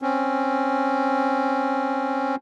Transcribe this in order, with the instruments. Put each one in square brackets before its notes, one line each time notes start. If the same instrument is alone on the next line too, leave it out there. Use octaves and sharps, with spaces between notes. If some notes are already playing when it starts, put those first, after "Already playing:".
[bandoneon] C4 C#4